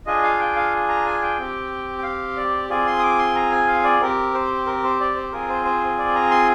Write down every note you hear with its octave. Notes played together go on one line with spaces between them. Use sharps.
D4 F4 G#4 D#5
F5
G5
F5
A#5
G#5
G5
C4 G4
G5
F5
D5
C4 F4 G#4 D5
C6
D#6
D6
C6
A#5
G#5
F5
D5
C4 G4 A#4
C5
A#4
C5
D5
C5
C4 F4 G#4 A#4
C5
C5
D5
A#5
C6